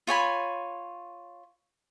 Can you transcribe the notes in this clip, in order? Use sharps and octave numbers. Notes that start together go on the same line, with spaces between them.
F4 C#5 G#5 B5